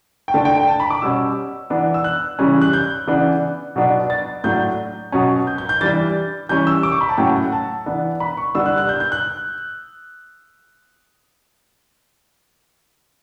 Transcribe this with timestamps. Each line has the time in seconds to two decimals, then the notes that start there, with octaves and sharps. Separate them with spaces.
0.28 G5
0.34 D3 A3 D4 A5
0.45 G5
0.57 G5
0.68 A5
0.80 B5
0.90 D6
1.02 B2 G3 C#4 E6
1.70 E3 B3 D4
1.94 E6
2.04 F#6
2.39 C#3 E3 G3 C#4
2.62 F#6
2.73 G6
3.07 C#3 E3 B3 D4
3.76 B2 F#3 B3 D4
4.10 A6
4.44 A2 F#3 A3 D4 G6
5.12 B2 F#3 C#4
5.47 G6
5.58 G6
5.69 G6
5.81 E3 G3 D4 A6
6.49 E3 G3 C#4 G6
6.67 E6
6.83 D6
6.92 C#6
7.01 B5
7.09 A5
7.18 A2 F#3 C#4 G5
7.35 F#5
7.52 A5
7.86 E3 B3 D4
8.20 B5
8.37 C#6
8.55 D3 G3 B3 D4 E6
8.66 F#6
8.78 F#6
8.89 G6
9.00 G6
9.12 F#6